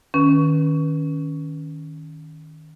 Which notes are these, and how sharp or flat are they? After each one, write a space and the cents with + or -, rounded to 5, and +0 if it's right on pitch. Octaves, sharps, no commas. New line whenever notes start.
D#3 +0 C#4 +10 B4 -20